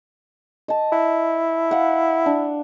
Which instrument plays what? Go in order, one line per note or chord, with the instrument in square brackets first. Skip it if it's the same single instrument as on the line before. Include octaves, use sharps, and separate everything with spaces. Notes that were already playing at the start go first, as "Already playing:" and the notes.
[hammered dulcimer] D#5 A5
[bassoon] E4
[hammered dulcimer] F5 F#5
D4